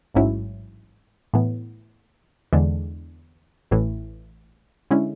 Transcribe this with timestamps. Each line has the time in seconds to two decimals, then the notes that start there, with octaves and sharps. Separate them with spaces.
0.14 A1 G#2 F#3 C#4 E4
1.34 A2 E3 B3
2.53 E2 D3 G#3 D4
3.71 A1 A2 E3
4.91 D3 G#3 C#4 E4